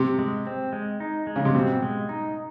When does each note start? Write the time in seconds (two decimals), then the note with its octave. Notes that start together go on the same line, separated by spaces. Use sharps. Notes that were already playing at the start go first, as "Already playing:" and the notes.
Already playing: C3
0.19 G#3
0.47 C4
0.73 G#3
1.00 D#4
1.27 G#3
1.36 C#3
1.45 C3
1.55 B2 C4
1.82 G#3
2.09 D#4